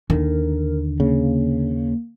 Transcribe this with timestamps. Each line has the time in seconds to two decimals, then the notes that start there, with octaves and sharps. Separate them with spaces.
0.10 D#2 D3 D#3 A#4
1.00 C#3 A#3